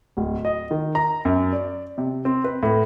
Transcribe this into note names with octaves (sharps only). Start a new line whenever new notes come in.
D1
D#5
D#3
A#5
F#2
D5
C3
C4
B4
A2